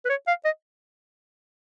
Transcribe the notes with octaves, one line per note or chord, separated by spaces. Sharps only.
B4
C#5
F5
D#5